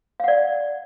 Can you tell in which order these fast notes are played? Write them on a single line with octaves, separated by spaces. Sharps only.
F5 F#5 D5